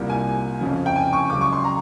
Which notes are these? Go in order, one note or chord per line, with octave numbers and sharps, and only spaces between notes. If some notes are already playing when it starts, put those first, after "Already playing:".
Already playing: C2 A#2 G3
G#5
F2 C#3 F3
G5
G#5
C#6
C#2 C#3 F#3 D6
C#6
C6
A#5